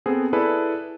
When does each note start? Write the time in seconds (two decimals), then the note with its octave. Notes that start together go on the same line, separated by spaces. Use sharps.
0.06 B3 C4 G#4 A4
0.33 E4 G#4 A4 B4 D5